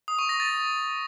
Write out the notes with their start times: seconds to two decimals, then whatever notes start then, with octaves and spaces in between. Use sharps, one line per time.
0.08 D#6
0.19 C#6
0.29 A#6
0.40 A6